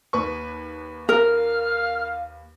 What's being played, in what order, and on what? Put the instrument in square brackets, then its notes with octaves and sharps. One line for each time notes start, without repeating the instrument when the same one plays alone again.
[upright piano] D#2 B4 C#6
[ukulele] A#4 [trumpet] F5 [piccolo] F6